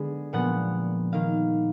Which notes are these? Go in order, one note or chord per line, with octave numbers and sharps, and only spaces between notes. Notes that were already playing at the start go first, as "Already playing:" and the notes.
Already playing: D3 G#3 B3 G#4
A#2 F3 B3 F#5
D#3 A#3 F5